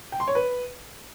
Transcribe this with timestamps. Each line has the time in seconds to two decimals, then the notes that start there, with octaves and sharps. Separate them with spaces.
0.12 G5
0.20 C6
0.28 C#5
0.35 B4